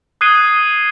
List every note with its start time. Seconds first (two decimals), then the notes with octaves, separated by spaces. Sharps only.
0.21 D#6 F#6 G#6 C7 D#7 G7